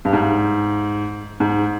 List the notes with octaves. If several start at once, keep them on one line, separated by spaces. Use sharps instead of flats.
G2
G#2
G#2